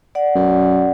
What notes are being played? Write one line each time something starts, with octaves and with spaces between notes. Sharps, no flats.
D5 F#5
F#2